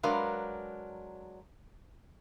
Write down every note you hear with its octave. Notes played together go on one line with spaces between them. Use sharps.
F#3 G#3 D4 A#4 B4 F5